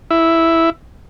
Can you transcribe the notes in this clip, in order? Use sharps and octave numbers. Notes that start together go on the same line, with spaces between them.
E4